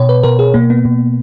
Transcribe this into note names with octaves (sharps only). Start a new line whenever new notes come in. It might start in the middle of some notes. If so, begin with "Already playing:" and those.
Already playing: B2 C#5
B4
B2 A#4
G#4
B2 A#3
B3
B2